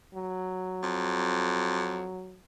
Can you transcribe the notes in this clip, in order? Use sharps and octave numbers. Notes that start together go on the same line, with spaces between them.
F#3
F2